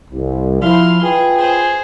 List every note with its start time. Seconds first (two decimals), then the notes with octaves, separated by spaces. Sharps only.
0.10 C2
0.61 F3 E4 F5 C6
1.03 F4 G#4 B4 G5
1.37 G#4 C5